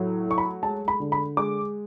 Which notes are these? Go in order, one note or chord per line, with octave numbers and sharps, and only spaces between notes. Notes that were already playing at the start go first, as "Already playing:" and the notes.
Already playing: A2 F#3
A3 C#6
B5
G#3 A5
B5
D3
B5
G#3 D6